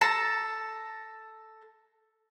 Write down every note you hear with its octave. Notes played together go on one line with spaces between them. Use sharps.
A4 A5 A#5